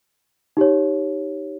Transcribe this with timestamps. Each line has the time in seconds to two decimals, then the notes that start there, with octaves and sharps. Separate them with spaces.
0.57 D#4 G4 C#5